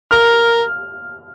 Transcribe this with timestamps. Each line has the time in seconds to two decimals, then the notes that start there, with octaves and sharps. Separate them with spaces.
0.11 A#4 F6